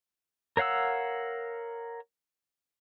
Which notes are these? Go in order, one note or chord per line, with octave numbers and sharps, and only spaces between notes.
A#4 C#5 F5 F#5 E6